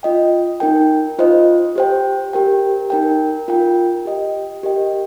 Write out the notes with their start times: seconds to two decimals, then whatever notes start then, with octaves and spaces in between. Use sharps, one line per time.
0.03 F4 D#5 G5
0.60 D#4 A#4 G5
1.19 F4 C5 D#5
1.76 G4 C5 G5
2.33 G4 A#4 G5
2.90 D#4 A#4 G5
3.48 F4 A#4 G5
4.05 G4 D#5 G5
4.63 G4 A#4 D#5 G5